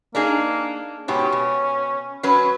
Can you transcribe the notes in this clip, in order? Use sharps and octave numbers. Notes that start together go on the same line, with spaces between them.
A#3 D4 D#4 G#4
G#2 B2 C#4 G4
B2
F#3 C#4 B4